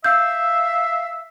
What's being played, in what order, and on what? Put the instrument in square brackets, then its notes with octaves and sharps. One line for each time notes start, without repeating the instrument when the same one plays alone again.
[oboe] E5 [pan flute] F5 [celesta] E6 G6